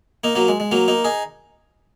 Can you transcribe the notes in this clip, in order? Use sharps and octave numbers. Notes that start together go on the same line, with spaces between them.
A#3 D#4
F#3 A#3
G#3
G#3
F#3 A#3
A#3 D#4
D#4 G#4